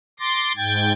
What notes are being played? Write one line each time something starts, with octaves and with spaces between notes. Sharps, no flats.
C6 D6 A6 A#6
G#2 G5 G#6 A6